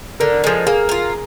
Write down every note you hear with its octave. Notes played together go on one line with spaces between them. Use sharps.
D3 A#4
F3 G#3
A#3 G#4
F4 A#4